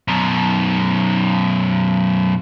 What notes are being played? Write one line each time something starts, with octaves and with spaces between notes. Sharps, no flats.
F#2 B2